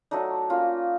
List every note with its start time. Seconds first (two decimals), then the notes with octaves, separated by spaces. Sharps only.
0.11 F#3 A3 D4 D#4
0.50 A#3 C#4 F4